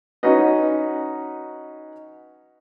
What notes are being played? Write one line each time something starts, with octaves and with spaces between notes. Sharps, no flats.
C#4 D#4 F#4 B4 D#5